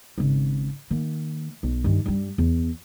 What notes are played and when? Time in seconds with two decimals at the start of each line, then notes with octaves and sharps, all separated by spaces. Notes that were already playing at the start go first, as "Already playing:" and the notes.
0.18 G#1 C#3
0.91 D#3 A#3
1.63 B1
1.84 G2 D#3
2.06 G2 G3
2.38 E2